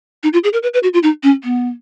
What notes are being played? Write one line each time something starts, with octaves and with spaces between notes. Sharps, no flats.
D#4
F4
G#4
A#4
B4
B4
F#4
F4
D#4
C#4
B3